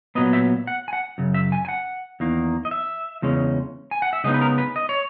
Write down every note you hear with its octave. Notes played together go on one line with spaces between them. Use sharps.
A#2 F#3 B3 D#5
E5
F#5
G#5
F#5
F#2 C#3
E5
G#5
G#5
F#5
E2 D#3 A#3
D#5
E5
E2 C#3 G#3 C#4
G#5
F#5
E5
C#3 G#3 B3 D#4 D#5
B4
A#4
B4
D#5
C#5